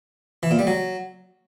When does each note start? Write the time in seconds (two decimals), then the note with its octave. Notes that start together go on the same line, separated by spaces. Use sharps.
0.43 E3
0.51 A#2
0.59 G3
0.67 F#3